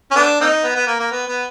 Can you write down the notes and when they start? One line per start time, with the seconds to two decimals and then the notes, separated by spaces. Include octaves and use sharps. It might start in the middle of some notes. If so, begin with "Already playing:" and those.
0.11 C#4
0.16 A3 B3 D4
0.40 A#3 C4 D#4
0.64 B3
0.76 B3
0.87 A#3
0.99 A#3
1.11 B3
1.27 B3